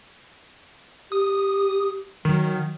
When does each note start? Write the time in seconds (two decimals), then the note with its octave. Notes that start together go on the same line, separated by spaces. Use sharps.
1.12 G4 D#6
2.25 D#3 F#3